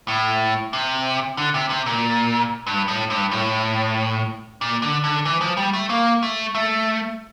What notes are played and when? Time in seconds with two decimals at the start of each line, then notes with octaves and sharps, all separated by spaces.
0.08 A2
0.73 C3
1.37 D3
1.54 C3
1.70 C3
1.86 A#2
2.67 G2
2.88 A2
3.10 G2
3.31 A2
4.61 A#2
4.82 D3
5.04 D3
5.25 E3
5.41 F3
5.57 G3
5.73 A3
5.90 A#3
6.23 A3
6.55 A3